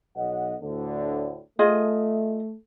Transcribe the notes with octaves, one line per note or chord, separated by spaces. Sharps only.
B1 D#5 F#5
D2 A2 D3
A3 F4 G#4 D#5